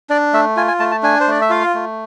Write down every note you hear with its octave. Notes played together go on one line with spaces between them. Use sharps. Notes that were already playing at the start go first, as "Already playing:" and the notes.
D4 D5
A3 E5
F4 G#5
G#5
A3 A5
A5
D4 G#5
C5
A3 D5
E5
F4 F5
A3